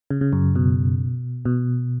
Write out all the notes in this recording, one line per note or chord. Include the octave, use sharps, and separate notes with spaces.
C#3
C#3
F#2
B2
B2